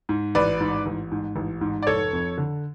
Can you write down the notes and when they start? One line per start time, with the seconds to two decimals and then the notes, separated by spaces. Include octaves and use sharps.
0.09 G#2
0.35 A1 B4 D5
0.60 G#2
0.86 A1
1.11 G#2
1.36 A1
1.61 G#2
1.83 D5
1.87 F1 A4 C#5
2.13 F2
2.38 D3